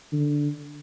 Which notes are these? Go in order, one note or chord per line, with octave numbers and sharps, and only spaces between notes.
D3